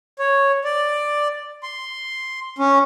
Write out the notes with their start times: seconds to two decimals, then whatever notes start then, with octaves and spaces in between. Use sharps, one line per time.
0.19 C#5
0.64 D5
1.63 C6
2.58 C#4